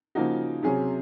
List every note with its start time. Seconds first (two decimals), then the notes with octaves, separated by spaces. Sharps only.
0.15 C#3 F3 A#3 D#4 F#4
0.63 C3 F#3 C#4 G#4